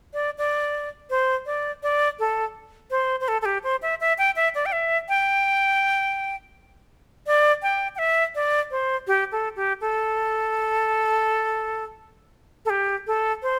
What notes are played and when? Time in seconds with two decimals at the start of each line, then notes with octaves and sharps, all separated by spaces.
0.14 D5
0.38 D5
1.10 C5
1.46 D5
1.83 D5
2.19 A4
2.91 C5
3.21 C5
3.28 A4
3.42 A4
3.45 G4
3.64 C5
3.82 E5
4.00 E5
4.18 G5
4.36 E5
4.55 D5
4.66 G5
4.72 E5
5.09 G5
7.27 D5
7.63 G5
7.95 G5
7.99 E5
8.35 D5
8.71 C5
9.07 G4
9.32 A4
9.56 G4
9.81 A4
12.65 A4
12.70 G4
13.07 A4
13.43 C5